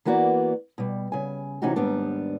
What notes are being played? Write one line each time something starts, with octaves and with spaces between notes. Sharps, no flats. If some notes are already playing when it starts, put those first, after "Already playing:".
E3 A#3 B3 F#4 D5
B2 G3
C#3 G#5
C3 E3 C#4 D#4 F#4 G4
D#2 G#2 G3 B3 D4